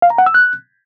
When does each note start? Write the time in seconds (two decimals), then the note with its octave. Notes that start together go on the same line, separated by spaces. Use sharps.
0.02 F5
0.10 A#5
0.18 F#5
0.26 E6
0.34 F#6